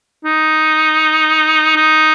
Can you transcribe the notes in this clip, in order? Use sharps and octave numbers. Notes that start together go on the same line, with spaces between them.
D#4
D#4